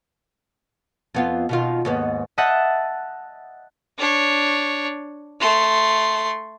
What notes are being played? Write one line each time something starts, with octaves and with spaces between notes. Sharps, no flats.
F2 B3 F4
B2 D#3 F4
D#2 G#2 B3
D#5 E5 F#5 A5 F#6 G6
D4 C#5
A3 C6